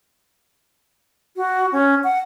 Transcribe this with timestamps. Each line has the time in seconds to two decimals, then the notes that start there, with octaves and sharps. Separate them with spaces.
1.36 F#4
1.72 C#4
2.04 F#5